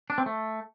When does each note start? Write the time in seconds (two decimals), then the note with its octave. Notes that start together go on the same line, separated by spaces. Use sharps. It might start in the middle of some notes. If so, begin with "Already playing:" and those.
0.10 D4
0.18 C4
0.26 A3